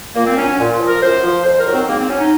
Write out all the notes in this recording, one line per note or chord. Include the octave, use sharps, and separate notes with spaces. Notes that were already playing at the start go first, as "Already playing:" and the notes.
A#2 A#3
C4
F#3 C#4
C#4
A#2
F3
A#4
F#2 C5
F3
F2 C5
A#4
D#3 F#3
C4
G#2 A#3
C4
F#3 C#4
D#4